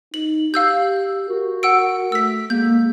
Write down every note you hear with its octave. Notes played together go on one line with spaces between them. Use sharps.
D#4 F#7
G4 F5 E6 G6
F#4 A#4
F#5 E6 D7
A3 E6 B6
G#3 A#3 G6